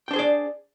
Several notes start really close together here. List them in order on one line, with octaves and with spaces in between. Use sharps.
G5 D4 C5 G#4 D5